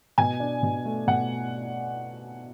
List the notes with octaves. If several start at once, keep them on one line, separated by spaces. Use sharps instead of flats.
B2 G#5
D4
B2
A3
B2 F#5